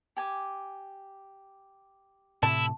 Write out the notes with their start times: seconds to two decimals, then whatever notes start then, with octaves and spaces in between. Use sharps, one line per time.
0.16 G4 G#5 D6
2.43 A2 C3 E4 A5